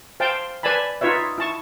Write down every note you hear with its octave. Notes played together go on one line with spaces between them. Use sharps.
C5 F5 G5 A5
B4 D5 G#5 A5 B5
D#4 F4 B4 C#5 E5
E4 A5 C#6